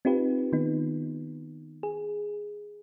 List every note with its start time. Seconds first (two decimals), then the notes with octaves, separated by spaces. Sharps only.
0.05 C4 D#4 F4 G4 B4
0.52 D#3 B3 D#4
1.83 G#4